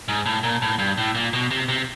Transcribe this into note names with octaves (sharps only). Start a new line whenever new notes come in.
G#2
A2
A#2
A2
G2
A2
A#2
B2
C3
C3